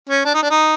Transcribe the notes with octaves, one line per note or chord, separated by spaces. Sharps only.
C#4
D4
D#4
D4
D#4